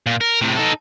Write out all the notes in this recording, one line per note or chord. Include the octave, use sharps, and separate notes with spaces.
A#2
A#4
A2 C3
D#4 A4